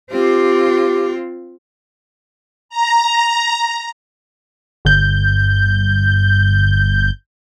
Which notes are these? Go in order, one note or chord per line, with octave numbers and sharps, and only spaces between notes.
C4 F4 G4
A#5
G1 G6